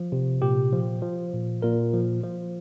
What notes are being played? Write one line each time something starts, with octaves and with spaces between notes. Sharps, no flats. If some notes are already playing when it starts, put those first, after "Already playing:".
Already playing: F3
C3
A#2 G4
F3
F3
A#2
A#2 A#4
F3
F3